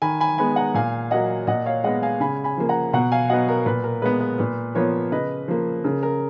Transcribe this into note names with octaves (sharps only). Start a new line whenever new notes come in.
D#3 G#5 B5
G#5 B5
G#3 B3 G#5 B5
F#5 A#5
A#2 F5 G#5
F#3 A#3 D#5 F#5
A#2 D#5 F#5
C#5 F5
G#3 B3 D#5 F#5
F5 G#5
C#3 G#5 B5
G#5 B5
F3 A#3
F#5 A#5
B2 F#5 A#5
F5 G#5
F#3 B3 D#5 F#5
A#4
A#2 B4
A#4
G#3 B3 B4
B4
A#2 B4
F3 B3 A#4 C#5
C#3 B4 D#5
F3 A#3
C#3 A#4
A#4